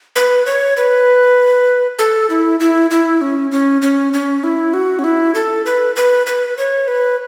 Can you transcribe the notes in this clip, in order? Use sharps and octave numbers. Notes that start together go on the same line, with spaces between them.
B4
C#5
B4
A4
E4
E4
E4
C#4
C#4
C#4
C#4
E4
F#4
C#4
E4
A4
B4
B4
B4
C#5
B4